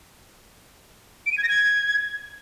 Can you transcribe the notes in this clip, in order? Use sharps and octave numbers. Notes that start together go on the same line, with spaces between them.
D7
D#7
G#6
A#6
G#6